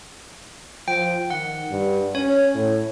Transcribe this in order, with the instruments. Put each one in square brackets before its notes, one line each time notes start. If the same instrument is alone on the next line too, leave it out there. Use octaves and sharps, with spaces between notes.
[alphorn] F3 [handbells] G5
[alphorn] D#3 [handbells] F#5
[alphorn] G2
[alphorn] C#4 [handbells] C#5
[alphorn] A2